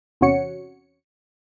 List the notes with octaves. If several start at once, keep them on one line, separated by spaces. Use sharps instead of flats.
E2 C3 C#4 F#4 C#5 C#7